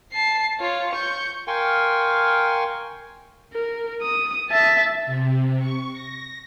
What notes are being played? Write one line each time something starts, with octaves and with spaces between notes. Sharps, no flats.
A5 C7
F4 C#5
C#6 G6
A#4 F5 G5 G#5 C6 C#6
A#4
D#6
E5 A5
C3
C#6
A#6